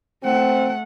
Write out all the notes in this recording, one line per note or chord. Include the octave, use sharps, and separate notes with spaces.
A3 C4 F#5